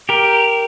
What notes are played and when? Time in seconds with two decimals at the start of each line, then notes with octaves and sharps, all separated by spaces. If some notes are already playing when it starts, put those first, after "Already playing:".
0.09 G4 A#4